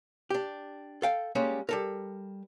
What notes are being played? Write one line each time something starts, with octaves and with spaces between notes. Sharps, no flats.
D4 G4
A4 F5 G5
G3 G#3 A#3 C#4
G3 A4 A#4